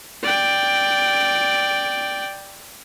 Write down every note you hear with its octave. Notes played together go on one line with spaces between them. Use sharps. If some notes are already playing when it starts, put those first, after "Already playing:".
D5 G5